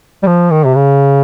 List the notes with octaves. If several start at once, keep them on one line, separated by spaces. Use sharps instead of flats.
G3
F3
D#3
C3
C#3